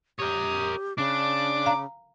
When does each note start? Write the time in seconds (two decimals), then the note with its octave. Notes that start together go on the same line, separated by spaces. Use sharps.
0.19 G4 A#4 C#5 D#6
0.98 C#3 D4 D6
1.66 F5 A#5